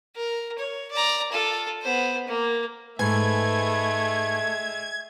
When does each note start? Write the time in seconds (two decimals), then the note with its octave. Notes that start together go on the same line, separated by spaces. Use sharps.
0.16 A#4
0.58 C#5
0.91 D5 A#5
1.32 F4 A4
1.82 B3 C5
2.27 A#3
2.99 G#2 G#3 A3 B4 E5 G#5 G#6